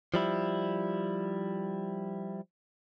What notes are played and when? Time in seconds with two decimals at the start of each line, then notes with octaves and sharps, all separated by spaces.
0.14 F3 G3 E4